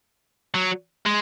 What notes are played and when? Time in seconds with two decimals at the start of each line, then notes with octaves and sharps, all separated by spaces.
0.55 F#3
1.06 G#3